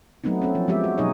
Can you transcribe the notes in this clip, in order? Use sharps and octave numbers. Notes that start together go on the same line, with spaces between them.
F#3 A3 B3 C4 D#4
C4 C#4 A4
F3
F3 G#3 B3 G4 E5
F#4
B2 F#3 D#4 G#4 C#5 D#5